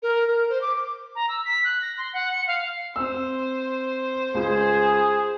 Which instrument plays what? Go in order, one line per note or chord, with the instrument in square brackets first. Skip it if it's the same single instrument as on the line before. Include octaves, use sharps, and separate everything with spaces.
[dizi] A#4
A#4
C5
D6
[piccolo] A#5
E6
B6
F#6
A#6
C6
F#5
C#7
F5
[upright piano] C4 E6 [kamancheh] C5
[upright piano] C#2 [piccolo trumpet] G#4